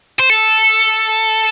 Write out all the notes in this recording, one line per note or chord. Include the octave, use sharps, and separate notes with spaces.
C5
A4